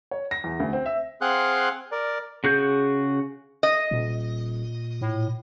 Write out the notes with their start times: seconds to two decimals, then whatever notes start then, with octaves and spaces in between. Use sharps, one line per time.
0.11 C#5
0.31 A#6
0.44 E2
0.60 D2
0.73 C4
0.86 E5
1.21 C4 G#4 F5 F#5 C6 F#6
1.92 A#4 D5
2.44 C#3 F#4 G#4 G6
3.63 D#5
3.91 D#1 A#2
5.01 A2